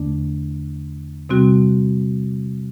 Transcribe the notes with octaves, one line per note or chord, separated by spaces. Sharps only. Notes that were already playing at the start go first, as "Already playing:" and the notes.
Already playing: E2 D3 A3 D4
C3 G3 C4 F#4